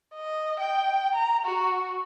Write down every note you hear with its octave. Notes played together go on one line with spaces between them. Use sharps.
D#5
G5
A#5
F#4